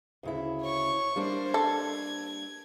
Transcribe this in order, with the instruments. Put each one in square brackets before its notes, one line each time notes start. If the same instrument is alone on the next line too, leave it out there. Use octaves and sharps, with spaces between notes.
[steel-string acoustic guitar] D2 C#3 E4
[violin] C#5 C#6
[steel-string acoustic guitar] G3 A#3 D4 [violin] C5
[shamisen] A4 [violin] G#6